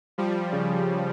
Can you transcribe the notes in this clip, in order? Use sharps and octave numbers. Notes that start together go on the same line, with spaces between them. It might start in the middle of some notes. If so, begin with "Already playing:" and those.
F3 G3
C#3